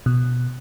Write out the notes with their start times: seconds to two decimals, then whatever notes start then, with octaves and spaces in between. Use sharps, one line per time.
0.06 B2